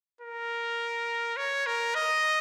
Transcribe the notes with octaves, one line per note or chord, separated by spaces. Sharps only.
A#4
C#5
A#4
D#5